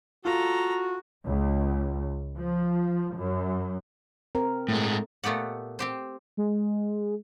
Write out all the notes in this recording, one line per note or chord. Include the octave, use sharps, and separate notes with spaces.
F4 F#4 A4 A#5
C#2
F3
F#2
C4 A#4
A2 G#3 A3
A#2 A3 B3 G4 F#5
C4 G4 C5
G#3